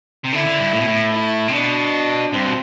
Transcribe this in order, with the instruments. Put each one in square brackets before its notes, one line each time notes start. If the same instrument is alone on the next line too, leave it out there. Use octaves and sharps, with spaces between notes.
[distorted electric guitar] C3
[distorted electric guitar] D3 [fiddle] E4
[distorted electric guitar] D3
G2
A2
B2
A2
[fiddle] E4
[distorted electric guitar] C3
[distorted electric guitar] B2 [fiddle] D4
[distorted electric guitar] G2 [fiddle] C4
[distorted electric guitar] B2